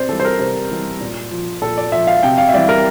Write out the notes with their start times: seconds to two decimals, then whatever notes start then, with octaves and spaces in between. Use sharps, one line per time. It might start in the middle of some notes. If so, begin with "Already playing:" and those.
Already playing: C3 C5 D5
0.09 E3 G3 A4
0.20 C5
0.25 A#4
0.39 C3 C5
0.71 E3 G3
1.01 A#2
1.31 F3
1.62 A#2 A4
1.77 D5
1.92 F3 E5
2.07 F5
2.23 C3 G5
2.38 F5
2.49 E5
2.53 E3 G3 D5
2.69 A#4